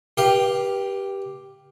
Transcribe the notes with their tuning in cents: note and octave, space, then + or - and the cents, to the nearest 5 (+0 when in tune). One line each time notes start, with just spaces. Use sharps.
G4 +0 B4 -35 F5 +0